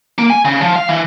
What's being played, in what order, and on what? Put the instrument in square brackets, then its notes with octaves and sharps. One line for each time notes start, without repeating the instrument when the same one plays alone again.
[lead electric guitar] A#3
G#5
C#3
F3
F5
E3